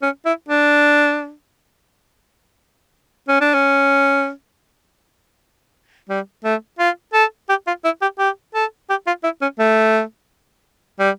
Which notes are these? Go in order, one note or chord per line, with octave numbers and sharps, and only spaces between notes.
C#4
E4
D4
C#4
D4
C#4
G3
A3
F4
A4
G4
F4
E4
G4
G4
A4
G4
F4
E4
C#4
A3
G3